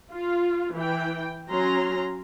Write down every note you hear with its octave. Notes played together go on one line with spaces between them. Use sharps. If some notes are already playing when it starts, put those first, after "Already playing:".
F4
E3 G5
F#3 C#4 A#5 C6